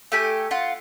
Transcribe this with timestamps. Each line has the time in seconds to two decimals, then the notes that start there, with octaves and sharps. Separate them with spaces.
0.12 A3 G4 G#5
0.51 F4 F#5